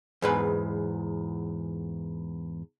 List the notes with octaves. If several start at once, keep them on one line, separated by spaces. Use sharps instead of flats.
E2 G#2 B4